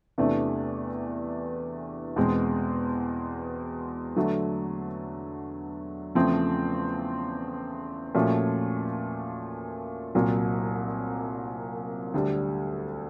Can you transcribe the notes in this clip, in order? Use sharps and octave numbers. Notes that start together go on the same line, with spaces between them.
E2 C3 E3 A3 D4
E2 B2 G#3 C4
D3 F#3 A3
E2 C#3 F3 A3 C4
A#2 F3 A3 C#4 F#4
C2 A#2 F#3
D2 D3 G3